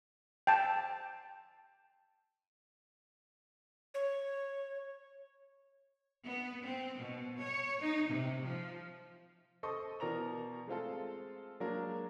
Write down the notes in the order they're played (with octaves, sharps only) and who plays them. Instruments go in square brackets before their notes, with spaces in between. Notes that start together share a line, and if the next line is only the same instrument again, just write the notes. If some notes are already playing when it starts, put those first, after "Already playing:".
[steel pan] G5 A5
[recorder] C#5
[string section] B3
C4
B2
C#5
D#4
C3
F3
[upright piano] A4 C5 D#5 C#6 D#6
B2 E3 A#4 D5 A#5 F7
G#3 A3 C4 F4 A4
F#3 G#3 A#3 D4 A#4